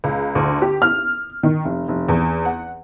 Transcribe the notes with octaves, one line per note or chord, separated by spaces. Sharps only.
C#2
D2
G4
F6
D#3
F1
F1
E2
F#5